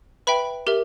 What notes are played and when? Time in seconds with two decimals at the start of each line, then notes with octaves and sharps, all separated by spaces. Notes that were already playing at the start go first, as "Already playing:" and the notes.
0.27 B4 E5 G5 B5
0.67 G4 A#4 E5